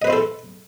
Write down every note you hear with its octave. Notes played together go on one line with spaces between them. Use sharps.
E4 A4 B4 C5 D#5